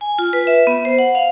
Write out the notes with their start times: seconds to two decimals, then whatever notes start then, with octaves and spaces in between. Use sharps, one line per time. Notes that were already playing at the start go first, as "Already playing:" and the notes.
0.01 G#5
0.19 F4
0.33 B4
0.47 E5
0.67 B3
0.85 C5
0.99 F#5
1.15 F5